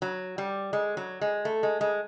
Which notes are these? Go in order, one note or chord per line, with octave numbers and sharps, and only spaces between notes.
F#3
G3
G#3
F#3
G#3
A3
G#3
G#3